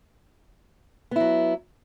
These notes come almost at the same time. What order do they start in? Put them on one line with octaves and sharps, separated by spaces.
B3 E4 F#3